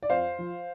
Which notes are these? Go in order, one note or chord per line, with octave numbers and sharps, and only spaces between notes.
D5
F2 C5 F5
F3